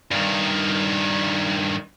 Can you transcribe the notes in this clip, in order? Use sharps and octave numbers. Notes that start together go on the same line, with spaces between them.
G2 D#3